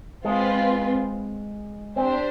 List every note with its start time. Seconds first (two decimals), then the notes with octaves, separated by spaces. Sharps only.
0.25 G#3 C4 F4 B4
1.96 C4 D4 G4 C5